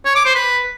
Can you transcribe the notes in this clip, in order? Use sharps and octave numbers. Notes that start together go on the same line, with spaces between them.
C#5
D6
C5
B4